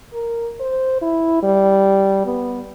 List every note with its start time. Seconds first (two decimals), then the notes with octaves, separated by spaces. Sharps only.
0.13 A#4
0.60 C5
1.01 E4
1.43 G3
2.25 B3